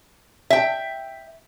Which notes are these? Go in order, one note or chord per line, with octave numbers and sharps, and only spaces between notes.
E5 G5